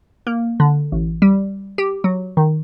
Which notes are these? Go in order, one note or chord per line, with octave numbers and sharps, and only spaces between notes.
A#3
D3
A1
G3
G4
F#3
D#3